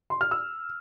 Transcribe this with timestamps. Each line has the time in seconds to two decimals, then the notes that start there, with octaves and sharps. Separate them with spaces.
0.10 C6
0.21 F6
0.31 E6